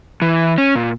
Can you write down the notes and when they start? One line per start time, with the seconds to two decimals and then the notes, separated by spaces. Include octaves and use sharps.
0.22 E3
0.58 C#4
0.75 A#2